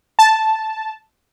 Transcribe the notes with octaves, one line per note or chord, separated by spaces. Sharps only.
A5